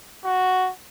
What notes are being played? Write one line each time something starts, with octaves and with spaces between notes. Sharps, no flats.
F#4